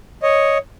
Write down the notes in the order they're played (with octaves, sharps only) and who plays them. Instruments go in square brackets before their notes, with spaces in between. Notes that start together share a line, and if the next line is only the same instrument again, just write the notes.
[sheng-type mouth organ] C#5 D#5